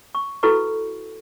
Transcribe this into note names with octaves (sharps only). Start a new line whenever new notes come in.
C#6
E4 F#4 A4 B4 B5 C#6